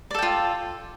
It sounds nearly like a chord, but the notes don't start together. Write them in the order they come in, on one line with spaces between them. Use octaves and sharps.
D5 A4 G5 F4